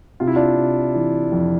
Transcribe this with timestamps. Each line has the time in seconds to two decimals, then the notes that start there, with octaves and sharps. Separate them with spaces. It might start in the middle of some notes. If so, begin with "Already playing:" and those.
0.20 C3 F4
0.27 E4
0.36 D4 F4
0.57 C3
0.95 E3
1.32 F2